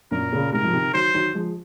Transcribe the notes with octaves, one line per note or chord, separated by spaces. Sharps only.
F#2 A#2 A#4
A#2 C#3
G#2 C3 A#4
F3
C3 D#3
D#3 F#3 C5
D#3 F#3
F3 G#3